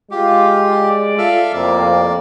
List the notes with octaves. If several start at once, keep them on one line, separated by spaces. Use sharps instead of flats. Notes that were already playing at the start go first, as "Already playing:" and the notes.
G#3 F4 G4
D5
F4 A4 E5 F5
F2 A2 C3 A#3 D5